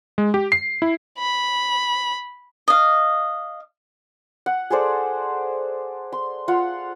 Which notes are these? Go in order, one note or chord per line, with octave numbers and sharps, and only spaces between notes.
G#3
G4
C7
E4
B5
D#5 F5
F#5
G#4 A4 C5 D5
C6
F4 F5 F#5